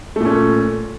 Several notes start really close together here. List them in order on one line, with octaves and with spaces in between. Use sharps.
A3 A#2 C#4